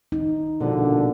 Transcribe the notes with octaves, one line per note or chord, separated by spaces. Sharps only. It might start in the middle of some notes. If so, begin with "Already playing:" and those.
D#4
A#1 B2 D3